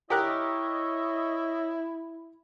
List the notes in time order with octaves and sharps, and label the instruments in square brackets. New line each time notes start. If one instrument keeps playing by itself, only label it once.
[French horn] E4 [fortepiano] G4 A#4 F#6 [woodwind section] C#5 D#5 E5